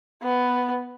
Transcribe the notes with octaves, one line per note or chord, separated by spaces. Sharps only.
B3